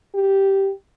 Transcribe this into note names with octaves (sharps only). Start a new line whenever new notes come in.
G4